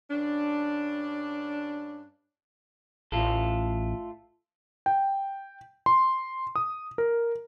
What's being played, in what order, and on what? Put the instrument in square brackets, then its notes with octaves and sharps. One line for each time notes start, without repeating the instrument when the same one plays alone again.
[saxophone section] G2 C#4 D4
[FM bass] A1 [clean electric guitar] A3 F4 A4
[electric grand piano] G5
C6
D#6
A#4